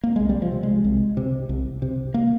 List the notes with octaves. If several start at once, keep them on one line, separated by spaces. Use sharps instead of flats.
A#3
C2 G#3
G3
F3
C3
G#3
C2
C3
C2
C3
A#3